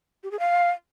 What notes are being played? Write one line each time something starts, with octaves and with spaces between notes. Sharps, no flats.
G4
G#4
F5